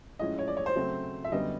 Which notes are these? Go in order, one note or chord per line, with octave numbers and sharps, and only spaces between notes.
A2 F3 G#3 C#4 D#5
C#5
D5
C#5
C5
C#3 F#3 A3 C4
E5
F#2 D3 G3 B3 D#5